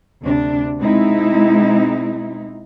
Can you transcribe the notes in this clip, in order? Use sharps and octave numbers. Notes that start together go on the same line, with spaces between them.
D2 C3 D4
B2 G#3 C4 D#4 E4